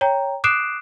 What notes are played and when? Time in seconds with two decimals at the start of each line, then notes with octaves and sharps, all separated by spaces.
0.01 C#5 G5 A#5
0.44 D6 D#6 F#6 C7 D7 E7